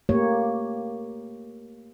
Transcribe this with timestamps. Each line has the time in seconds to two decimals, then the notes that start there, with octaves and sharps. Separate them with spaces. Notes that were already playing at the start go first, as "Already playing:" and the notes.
0.09 A3 A#3 G4 C#5